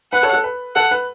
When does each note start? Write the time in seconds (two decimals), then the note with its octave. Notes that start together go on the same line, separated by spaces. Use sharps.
0.12 B4 F#5
0.23 A4 C#5
0.33 A4
0.44 B4
0.76 A4 F#5
0.91 B4